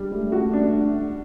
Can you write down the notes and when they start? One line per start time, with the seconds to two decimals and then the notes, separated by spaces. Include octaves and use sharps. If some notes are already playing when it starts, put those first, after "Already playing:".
Already playing: G3 D4
0.11 G3 A3
0.32 F#4
0.53 D4